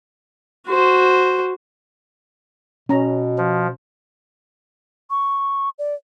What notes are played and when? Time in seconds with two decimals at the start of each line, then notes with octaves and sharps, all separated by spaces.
0.68 F#4 C5
2.89 B2 C#4 A#5
3.38 F3
5.10 C#6
5.79 D5